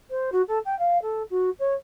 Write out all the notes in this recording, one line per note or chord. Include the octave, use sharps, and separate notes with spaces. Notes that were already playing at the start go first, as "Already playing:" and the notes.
C5
F#4
A4
G5
F5
A4
F#4
C#5